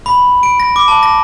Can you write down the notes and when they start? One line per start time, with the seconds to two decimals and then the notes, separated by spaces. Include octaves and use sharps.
0.06 B5
0.43 D7
0.60 A#6
0.76 D6
0.88 A5
1.03 A#6